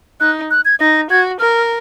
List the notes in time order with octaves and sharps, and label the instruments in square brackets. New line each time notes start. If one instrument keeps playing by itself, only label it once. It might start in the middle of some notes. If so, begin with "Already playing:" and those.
[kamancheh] D#4 [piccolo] F#6
[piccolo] F#6
G#6
[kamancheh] D#4 [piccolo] A#6
[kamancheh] F#4 [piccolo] G#6
[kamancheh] A#4 [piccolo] F6